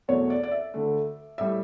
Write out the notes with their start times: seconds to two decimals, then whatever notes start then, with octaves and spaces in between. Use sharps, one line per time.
0.08 E2 B2 F#3 A3 C#5
0.30 D5
0.43 D5
0.51 E5
0.74 D2 D3 A3
1.38 A2 G3 E5